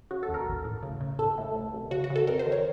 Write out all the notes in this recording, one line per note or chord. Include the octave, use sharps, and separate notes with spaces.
C#3 F#4
A4
D#2
A#4
A1
A2
C#3
C#3
A2 A4
A2
C2
C2
C#3 F#4
F#4
C#3
A4
F2 A#4
C5
D#3
C#5